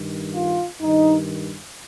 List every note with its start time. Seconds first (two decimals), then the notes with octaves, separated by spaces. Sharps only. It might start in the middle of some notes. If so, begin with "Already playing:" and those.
Already playing: G2 D#3
0.34 F4
0.81 G2 D#3 D#4